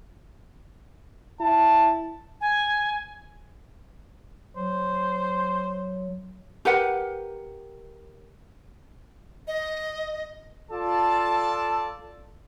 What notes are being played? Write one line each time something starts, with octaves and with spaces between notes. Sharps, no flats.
E4 A5
G#5
F#3 C5
G4 A#4 B4 F#5
D#5
F4 A4 D5 A5